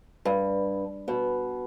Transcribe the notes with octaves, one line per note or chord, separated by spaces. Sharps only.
G2
B2